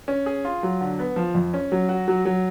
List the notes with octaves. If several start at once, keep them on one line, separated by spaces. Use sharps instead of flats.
C#4
G#4
F4
F#3
D3
B3
F3
F2
C#4
F#3
F#4
F#3
F#3